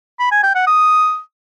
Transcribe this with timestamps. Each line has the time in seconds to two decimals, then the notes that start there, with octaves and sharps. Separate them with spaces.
0.19 B5
0.31 G#5
0.43 G5
0.55 F#5
0.67 D#6